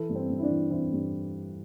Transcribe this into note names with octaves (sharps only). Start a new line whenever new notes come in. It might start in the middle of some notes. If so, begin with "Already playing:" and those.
Already playing: E3 E4 A4
G2
C4
G2
E4
D4
E3
E3 C4 E4
G2